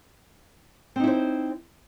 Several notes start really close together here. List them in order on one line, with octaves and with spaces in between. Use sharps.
C4 D#4 E4 C5